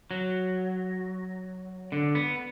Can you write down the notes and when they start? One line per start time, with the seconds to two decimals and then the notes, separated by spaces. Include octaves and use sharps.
0.11 F#3
1.92 D3
2.15 B3